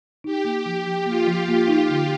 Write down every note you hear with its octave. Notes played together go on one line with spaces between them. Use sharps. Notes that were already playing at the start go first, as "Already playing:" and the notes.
D#4 G4
A#3
F3
F3
A#3 F4
F3
A#3
D#4
D3